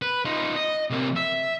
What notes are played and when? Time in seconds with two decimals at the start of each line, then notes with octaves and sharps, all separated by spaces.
0.02 B4
0.25 D#4 F4
0.56 D#5
0.90 C3 A#3
1.16 E5